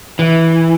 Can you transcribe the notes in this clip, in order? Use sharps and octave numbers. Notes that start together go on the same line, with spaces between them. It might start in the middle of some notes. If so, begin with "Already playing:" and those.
E3